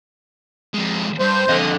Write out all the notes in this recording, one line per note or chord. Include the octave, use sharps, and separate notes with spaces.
F2 G#3
G2 C5
F2 D3 D#5